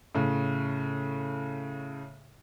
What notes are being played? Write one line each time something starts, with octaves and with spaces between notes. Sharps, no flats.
A2 C#3